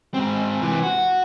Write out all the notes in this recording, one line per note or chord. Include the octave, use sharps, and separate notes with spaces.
G#2 C4
C3 E3
F#4